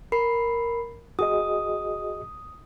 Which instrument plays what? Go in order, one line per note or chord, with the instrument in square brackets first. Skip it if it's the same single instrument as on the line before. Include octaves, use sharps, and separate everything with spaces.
[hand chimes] A#4 B5 C7
[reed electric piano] F#4 G#4 D#5 [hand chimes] D#6